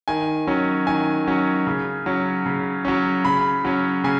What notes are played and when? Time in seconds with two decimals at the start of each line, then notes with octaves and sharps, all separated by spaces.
0.08 D#3 G#5
0.47 F#3 C#4
0.87 D#3 G#5
1.27 F#3 C#4
1.67 C#3
2.06 F#3 C#4
2.46 C#3
2.85 F#3 C#4
3.25 C#3 B5
3.65 F#3 C#4
4.04 C#3 G#5